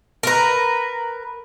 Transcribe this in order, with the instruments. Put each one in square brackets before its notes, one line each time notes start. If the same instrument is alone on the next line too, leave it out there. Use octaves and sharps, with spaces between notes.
[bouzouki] A#4 B4